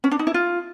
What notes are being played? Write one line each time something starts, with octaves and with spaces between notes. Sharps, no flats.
C#4
D4
D#4
E4
F4